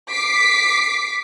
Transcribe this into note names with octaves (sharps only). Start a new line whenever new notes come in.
D6 B6 C7